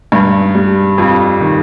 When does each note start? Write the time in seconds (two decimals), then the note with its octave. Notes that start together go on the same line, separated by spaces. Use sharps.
0.12 G2
0.55 G3
0.98 F2
1.40 D#3